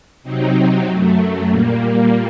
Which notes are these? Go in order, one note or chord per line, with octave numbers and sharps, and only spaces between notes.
C3 F#3 C4 D#4
F#2 F#3 A3
A#2 G3 A#3